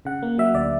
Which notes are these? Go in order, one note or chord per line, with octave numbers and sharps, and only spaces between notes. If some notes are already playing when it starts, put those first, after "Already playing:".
C#3 F#5
A#3
F#3 E5
D2 D5